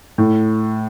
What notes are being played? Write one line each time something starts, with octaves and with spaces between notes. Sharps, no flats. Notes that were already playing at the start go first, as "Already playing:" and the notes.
A2